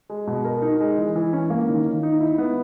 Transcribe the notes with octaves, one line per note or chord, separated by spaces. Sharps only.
G#3
B2
A#4
D#4
G#3
E3
E3
C#4
A#3
D#3
D#3
D#4
E4
B3